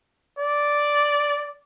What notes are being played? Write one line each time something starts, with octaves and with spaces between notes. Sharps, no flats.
D5